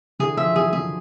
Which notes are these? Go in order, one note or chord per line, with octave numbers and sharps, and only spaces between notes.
D3 E3 G#4
D#3 F3 E5
E3 F#3 G#4
D3 E3 G#4